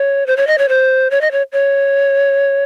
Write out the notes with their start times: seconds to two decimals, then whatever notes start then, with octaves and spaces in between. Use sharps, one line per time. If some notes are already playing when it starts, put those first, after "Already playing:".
Already playing: C#5
0.27 C5
0.37 C#5
0.47 D#5
0.58 C#5
0.69 C5
1.11 C#5
1.21 D#5
1.31 C#5
1.53 C#5